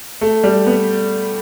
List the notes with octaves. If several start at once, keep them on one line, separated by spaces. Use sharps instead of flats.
A3
G3
B3